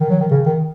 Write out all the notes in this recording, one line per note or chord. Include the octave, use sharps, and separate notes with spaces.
D#3
F#3
D#3
C#3
D#3